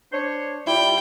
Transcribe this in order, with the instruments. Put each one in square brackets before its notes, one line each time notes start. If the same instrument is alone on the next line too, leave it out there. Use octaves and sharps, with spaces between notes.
[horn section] D4 C5 C#5
[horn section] G3 [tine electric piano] E4 F4 [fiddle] G5